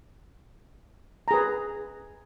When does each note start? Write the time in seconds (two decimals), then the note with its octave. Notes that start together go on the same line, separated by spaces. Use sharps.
1.28 A#5
1.31 G#4
1.34 B4